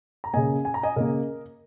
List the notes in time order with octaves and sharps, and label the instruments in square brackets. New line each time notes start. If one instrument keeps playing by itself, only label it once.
[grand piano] A#5
C#3 A#3 D#5 G#5
G#5
A#5
D#5 G#5
C#3 A#3 A#4 D#5